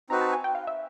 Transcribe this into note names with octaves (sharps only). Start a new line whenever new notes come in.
C4 D#4 F#4 B4 A#5
A5
G#5
G5
F5
E5